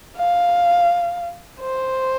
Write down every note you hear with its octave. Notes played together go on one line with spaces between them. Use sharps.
F5
C5